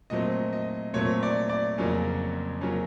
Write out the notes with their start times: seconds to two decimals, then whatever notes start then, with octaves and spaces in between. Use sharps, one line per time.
0.10 A#2 F#3 A3 C4 D#5
0.53 D#5
0.94 A#2 F#3 A3 C4 C#5
1.23 D5
1.49 D5
1.78 F2 C#3 F#3 A#3 C#4
2.61 C#3 F#3 A#3 C#4